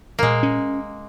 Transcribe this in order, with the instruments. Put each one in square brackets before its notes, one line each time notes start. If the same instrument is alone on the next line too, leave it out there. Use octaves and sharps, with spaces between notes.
[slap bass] A#2 [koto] G#3 A#3
[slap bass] C#4